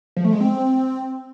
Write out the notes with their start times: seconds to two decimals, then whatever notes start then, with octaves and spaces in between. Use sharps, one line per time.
0.16 F3
0.25 A3
0.33 G#3
0.41 C4